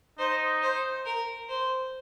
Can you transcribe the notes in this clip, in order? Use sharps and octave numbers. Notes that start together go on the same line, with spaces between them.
D#4 C5
C5
A#4
C5